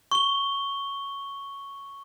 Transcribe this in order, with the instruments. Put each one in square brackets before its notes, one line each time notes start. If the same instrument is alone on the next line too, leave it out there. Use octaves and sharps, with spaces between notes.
[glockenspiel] C#6 G7